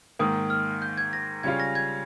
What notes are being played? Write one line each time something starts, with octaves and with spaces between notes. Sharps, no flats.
G#2 D#3 A#3 D#6
F6
G6
G#6
A#6
C#3 G3 C#4 F4 G#6
A#6
G#6